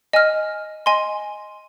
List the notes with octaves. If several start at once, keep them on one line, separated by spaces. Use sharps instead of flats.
D#5 G#5 F6
D#5 G#5 C6